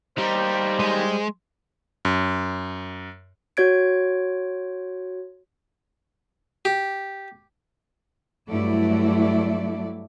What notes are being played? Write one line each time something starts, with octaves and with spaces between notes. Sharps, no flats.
G3 D#4 G4 C5
G#3
F#2
F#4 C#5 G#6 D7
G4
G2 F#3 A3 E4 D5